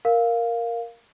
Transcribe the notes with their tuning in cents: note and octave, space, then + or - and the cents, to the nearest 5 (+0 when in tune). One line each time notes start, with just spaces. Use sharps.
A#4 +0 F5 +0